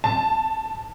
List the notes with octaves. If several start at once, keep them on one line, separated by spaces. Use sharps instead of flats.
A5